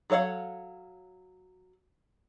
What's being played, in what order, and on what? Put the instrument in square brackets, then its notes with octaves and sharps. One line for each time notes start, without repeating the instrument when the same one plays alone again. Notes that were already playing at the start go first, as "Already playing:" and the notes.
[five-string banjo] F#3 A4 C#5 F5 F#5